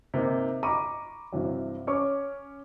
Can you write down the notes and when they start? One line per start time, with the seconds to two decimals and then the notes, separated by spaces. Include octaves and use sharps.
0.14 C3 A#3 D#4
0.63 A#5 B5 C#6 D6 D#7
1.32 G2 C3 E3 F#3
1.87 C#4 C#5 C#6 D6